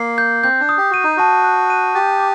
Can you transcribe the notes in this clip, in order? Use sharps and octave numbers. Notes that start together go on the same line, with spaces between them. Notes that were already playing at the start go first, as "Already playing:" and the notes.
Already playing: A#3 C7
G6
C4 G6
D4
D#6
G4
F#4 D#7
D#4
F#4 A5
F#6
D#7
G4 A6
D6